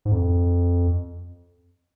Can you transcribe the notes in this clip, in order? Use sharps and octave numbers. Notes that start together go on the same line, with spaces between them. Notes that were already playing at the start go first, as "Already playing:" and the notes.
G#2
F2